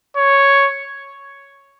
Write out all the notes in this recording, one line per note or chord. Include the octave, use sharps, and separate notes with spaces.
C#5